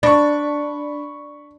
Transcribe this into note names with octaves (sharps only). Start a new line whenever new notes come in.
D4 B5 C#6